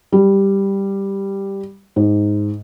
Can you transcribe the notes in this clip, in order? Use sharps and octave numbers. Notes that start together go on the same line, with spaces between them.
G3
G#2